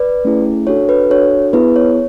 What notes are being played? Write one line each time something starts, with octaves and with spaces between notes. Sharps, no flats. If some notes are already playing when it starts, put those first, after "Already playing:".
Already playing: B4 D5
A3 C#4 E4 G#4
D4 F#4 A4 C#5
B4
D4 F#4 A4 C#5
B3 E4 G#4 B4
C#5